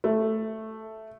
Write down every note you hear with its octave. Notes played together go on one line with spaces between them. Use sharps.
A3